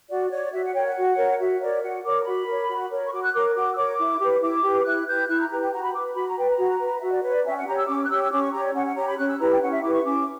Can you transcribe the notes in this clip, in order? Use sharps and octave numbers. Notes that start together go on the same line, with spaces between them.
F#4 D5
C#5 D5
F#4 E5
F#5
A#4 C#5 G5
F#5
F#4
A#4 C#5
F#4 E5
A#4 C#5 D5
F#4 F#5
A#4 C#5 D6
A#5
F#4 B5
A#4 C#5
F#4
A#4 C#5
C#6
F#4 D6
F#6
A#4 C#5 D6
F#4 D6
E6
A#4 C#5 D6
E4
G4 B4
E4 D6
G4 B4
E4 F#6
G4 B4 G6
E4 F#6
A#5
G4 B4 A#5
G5
F#4 A#5
B5
B4 D6
F#4 B5
A#5
B4 G5
A#5
F#4
B4
F#4 E5
D5
B4 C#5
D5
C#4 E5 G5
F#5
G4 C#5 A#5
E6
C#4 D6
F#6
G4 C#5 E6
E6
C#4 D6
C#6
G4 C#5 A#5
D5
C#4 F#5
F#5
G4 C#5 A#5
B5
C#4 F#6
E6
E4 G4 B4 A#5
G5
C#4 F#5
E5
E4 G4 B4 D6
C#6
C#4 D6